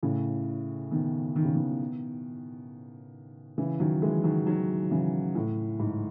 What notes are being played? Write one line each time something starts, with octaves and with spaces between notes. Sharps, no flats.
A2 C#3
B2 D#3
D#3
C#3
B2 D#3
C#3 E3
D#3 F#3
E3 G#3
D#3 F#3
D#3 F#3
C#3 E3
A2
G#2